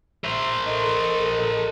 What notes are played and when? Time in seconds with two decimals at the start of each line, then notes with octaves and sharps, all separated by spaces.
0.24 A#4 C5 E5
0.67 A4 D#5